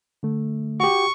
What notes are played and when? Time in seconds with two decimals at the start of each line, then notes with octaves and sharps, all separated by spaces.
0.23 D3 A3
0.80 F#4 G4 C#6